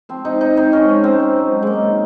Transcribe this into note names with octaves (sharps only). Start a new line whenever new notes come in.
F3 C4
C3 D#4
C3 D#4
C3 D#4
G#2 C#4
F3
G#2 C4
F3
F#3
F#3
F#2 G#3 A#3
D#3